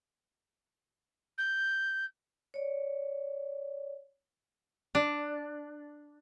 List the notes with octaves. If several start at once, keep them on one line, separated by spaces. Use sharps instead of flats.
G6
C#5 D5
D4